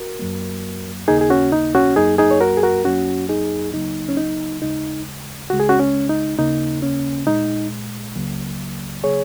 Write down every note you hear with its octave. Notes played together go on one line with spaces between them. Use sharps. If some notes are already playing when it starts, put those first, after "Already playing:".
Already playing: F#4 A#4
F#2 F#3 A#3
D#2 C#3 A#3 D#4 G#4
G#4
C#4 F#4
D#4
C#4 F#4
F#2 F#3 A#3 D#4 G#4
D#4 G#4
C#5
F#4 A#4
G#4
F#4 A#4
F#2 F#3 A#3 C#4 F#4
D#4 G#4
C#2 C#3 F#3 A#3 D#4
C#4
D#4
D#2 C#3 G#3 D#4
C#2 C#3 G#3 F#4
G#4
C#4 F#4
C#4
D#4
D#2 C#3 A#3 D#4
C#4
A#2 G#3 D#4
C#2 C#3 F#3 A#3
C#3 F#3 A#3 G#4 C#5